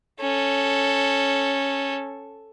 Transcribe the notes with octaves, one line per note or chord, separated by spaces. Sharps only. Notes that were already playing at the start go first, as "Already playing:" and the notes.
C#4 A4